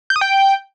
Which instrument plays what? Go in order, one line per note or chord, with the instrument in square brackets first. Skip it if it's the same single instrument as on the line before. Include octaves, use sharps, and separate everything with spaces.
[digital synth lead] G6
D#6
G5